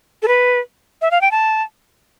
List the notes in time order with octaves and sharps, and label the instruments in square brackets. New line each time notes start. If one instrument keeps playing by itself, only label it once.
[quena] A4
B4
E5
F5
G5
A5